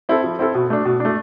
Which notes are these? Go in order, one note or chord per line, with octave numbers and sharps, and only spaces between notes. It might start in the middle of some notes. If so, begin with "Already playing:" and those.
C4 E4 A4
F3
C4 E4 A4
B2
A3 D4
B2
A3 D4